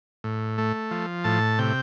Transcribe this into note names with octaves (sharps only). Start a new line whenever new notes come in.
A2
A3
F3
A2 A5
C3 G5